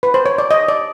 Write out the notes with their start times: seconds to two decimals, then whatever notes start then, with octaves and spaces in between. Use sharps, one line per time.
0.03 B4
0.14 C5
0.26 C#5
0.38 D5
0.51 D#5
0.68 D5